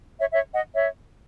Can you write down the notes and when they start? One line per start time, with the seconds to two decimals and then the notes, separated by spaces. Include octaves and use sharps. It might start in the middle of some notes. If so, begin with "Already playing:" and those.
0.19 C#5 E5
0.33 C#5 E5
0.53 D#5 F#5
0.74 C#5 E5